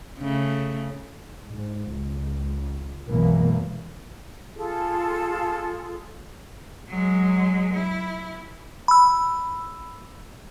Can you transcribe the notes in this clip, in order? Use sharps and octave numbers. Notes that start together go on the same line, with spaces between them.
C#3 A3
G#2
C#2
B1 F#2 B2 E3 G#3 A#3
F4 G#4 A4
F#3 G#3
E4
B5 E6